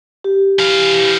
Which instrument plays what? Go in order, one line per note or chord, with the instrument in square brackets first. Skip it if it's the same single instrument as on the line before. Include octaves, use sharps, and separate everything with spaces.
[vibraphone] G4
[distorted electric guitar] E3 F5